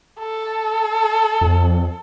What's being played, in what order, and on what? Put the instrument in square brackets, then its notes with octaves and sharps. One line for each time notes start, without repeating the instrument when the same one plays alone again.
[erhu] A4
[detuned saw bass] F2